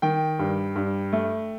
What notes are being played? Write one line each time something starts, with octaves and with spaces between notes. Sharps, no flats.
D#3 G5
G2
G2
A3